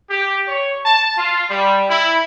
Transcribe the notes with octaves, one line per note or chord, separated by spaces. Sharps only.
G4
C#5
A5
F4
G3
E4